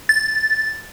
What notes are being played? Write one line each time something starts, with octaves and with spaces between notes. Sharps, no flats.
A6